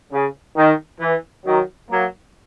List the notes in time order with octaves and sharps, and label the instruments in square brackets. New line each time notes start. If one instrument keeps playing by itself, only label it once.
[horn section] C#3
D#3
E3
D#3 F#3
F#3 A#3